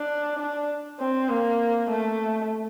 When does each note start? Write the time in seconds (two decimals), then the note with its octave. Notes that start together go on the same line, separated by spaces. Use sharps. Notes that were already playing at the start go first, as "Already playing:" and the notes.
Already playing: D4
0.39 D4
0.99 C4
1.30 A#3
1.90 A3